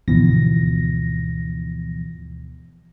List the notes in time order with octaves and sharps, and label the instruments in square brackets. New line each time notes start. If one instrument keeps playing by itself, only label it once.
[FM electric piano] D2 G#2 B2 E3 F3 A#6